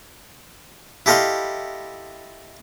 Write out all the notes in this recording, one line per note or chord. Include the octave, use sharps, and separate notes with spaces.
E4 G4 A4 D#5 F5 C6